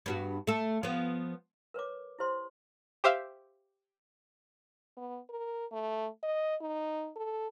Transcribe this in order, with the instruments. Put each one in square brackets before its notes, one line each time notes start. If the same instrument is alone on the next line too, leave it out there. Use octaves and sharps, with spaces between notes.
[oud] G2 B3 F#4
A3 A4
F3 B3
[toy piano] A#4 B4 C#5 D6
E4 G4 C5 C6
[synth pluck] G4 C5 E5 F5
[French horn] B3
A#4
A3
D#5
D#4
A4